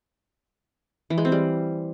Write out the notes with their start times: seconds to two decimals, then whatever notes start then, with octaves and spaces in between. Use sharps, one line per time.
1.10 E3
1.18 G#3
1.25 C4
1.32 G3